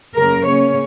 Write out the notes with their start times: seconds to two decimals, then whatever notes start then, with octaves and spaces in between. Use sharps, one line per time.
0.16 F#2 C#3 A#3 A#4
0.46 C#3 A#3 C#4 C#5